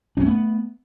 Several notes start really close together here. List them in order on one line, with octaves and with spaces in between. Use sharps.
D4 C#4 A3 B3